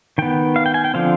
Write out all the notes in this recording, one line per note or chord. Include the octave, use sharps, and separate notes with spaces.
D#3 B3 G5
F5
G5
G#5
G5
D3 F3 C4 F5